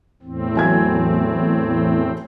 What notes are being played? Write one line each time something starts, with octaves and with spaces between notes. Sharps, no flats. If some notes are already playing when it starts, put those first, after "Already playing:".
E2 A2 C4
F#3 G#5 G#6